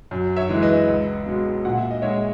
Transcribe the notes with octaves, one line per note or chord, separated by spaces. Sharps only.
F#2
C#5 E5
E3 G#3
B4 D#5
C#2
B2 G#3
A#2 F#5
E5
D#5
G#3 C#5 E5